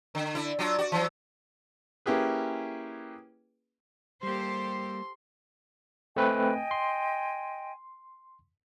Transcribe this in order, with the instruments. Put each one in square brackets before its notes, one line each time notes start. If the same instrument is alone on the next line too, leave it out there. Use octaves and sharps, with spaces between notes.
[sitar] D3
D3 E4
F#3 D4 F4
F#4 D5
E3 F#3
[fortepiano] A#3 C#4 E4 G4 G#4 B4
[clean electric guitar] G3 A#3 [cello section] G4 A4 C5 [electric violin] C6
[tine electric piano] A3 C4 B4 [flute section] D#5 G5 G#5
[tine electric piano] C6